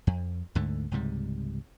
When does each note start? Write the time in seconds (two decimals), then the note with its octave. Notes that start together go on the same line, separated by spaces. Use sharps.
0.07 F2
0.55 D2 G#2 D3 A3
0.91 C#2 G#2 C3 G3